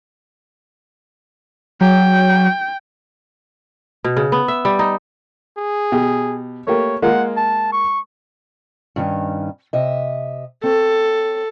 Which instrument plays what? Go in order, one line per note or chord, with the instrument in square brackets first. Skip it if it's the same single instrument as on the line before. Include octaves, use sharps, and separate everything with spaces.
[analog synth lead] F#3 [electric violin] G5
[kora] B2
C#3
B3
E5
G3
D#4
[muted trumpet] G#4
[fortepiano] B2 G4
[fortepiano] A3 A#3 G4 [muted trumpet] C#5
[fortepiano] G#3 A#3 F4 [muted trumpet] F#5
[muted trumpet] A5
C#6
[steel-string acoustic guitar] G2 D#3 C#4
C3 D#5 E5
[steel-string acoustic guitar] C4 C#5 [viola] A4